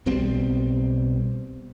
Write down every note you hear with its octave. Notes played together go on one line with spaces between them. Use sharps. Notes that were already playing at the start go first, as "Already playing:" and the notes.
B1 B2 G3 C4